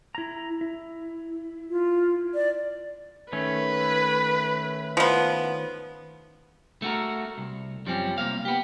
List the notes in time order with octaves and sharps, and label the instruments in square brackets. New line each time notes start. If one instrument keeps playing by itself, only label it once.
[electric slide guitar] E4 A#5
E4
[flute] F4
D5
[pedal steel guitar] D#3 A3 C#4 [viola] B4
[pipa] F3 B3
[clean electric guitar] A3 F#4 A#4
C2
F#2 F3 G3 C4 C#4
C2 A#3 F5
B3 G4